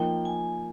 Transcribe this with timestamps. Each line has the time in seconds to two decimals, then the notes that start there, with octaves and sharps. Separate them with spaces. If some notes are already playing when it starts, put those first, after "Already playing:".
Already playing: F3 A#3 D#4 G5
0.25 G#5